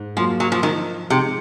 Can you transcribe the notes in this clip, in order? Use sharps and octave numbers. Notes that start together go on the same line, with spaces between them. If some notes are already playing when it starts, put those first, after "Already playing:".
Already playing: G#2
F3 F#3 A#3 F4
F#3
F3
D#3 F3
C3 G#3 D#4